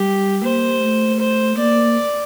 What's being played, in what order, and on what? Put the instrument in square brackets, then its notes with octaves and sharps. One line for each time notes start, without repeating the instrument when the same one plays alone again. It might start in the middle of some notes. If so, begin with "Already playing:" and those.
Already playing: [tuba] G3 [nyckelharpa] G4
[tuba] A#3 [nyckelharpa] C5
[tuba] A3
[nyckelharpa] C5
[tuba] A#3 [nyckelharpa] D5